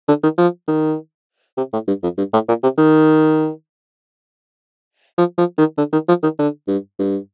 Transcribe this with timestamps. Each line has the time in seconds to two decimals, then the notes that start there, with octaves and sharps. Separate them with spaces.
0.08 D3
0.23 D#3
0.38 F3
0.68 D#3
1.57 C3
1.73 A2
1.88 G2
2.03 F2
2.18 G2
2.33 A2
2.48 A#2
2.63 C3
2.78 D#3
5.18 F3
5.38 F3
5.58 D#3
5.78 D3
5.93 D#3
6.08 F3
6.23 D#3
6.39 D3
6.68 G2
6.99 G2